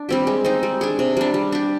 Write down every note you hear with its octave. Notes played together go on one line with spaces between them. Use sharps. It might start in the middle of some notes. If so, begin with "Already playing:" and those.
Already playing: D4
G3 C4 G4
G#3
C4 D#4
G3
D4 G#4
C3
G3 D4
G3
D4 G4